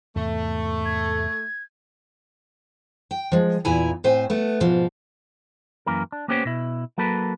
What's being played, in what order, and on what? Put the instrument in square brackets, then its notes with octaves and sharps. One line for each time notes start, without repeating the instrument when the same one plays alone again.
[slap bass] E2 G#2 C3 [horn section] A3
[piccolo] G#6
[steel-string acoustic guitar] G5
F3 G#3
E2 A#2 E4 G#5 A#5
A2 C4 C5 G#5
A3 B3
G#2 B2 F3
[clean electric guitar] F#2 E3 A#3 A#4
D4
A#3 B3 C#4 G4 C5 C#5
B2 E4
F#3 A#3 A4 B4